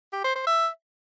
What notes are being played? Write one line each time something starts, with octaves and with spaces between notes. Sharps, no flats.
G4
C5
C5
E5